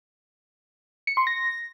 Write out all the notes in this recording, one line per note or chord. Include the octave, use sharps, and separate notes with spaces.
C#7
C6
A#6